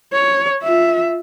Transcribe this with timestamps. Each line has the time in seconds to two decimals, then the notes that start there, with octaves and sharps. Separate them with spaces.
0.13 C#5
0.63 F4 E5